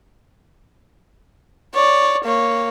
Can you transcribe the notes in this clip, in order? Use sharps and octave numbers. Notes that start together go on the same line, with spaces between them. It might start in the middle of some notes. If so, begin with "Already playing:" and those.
C#5 D5
A#3 C#5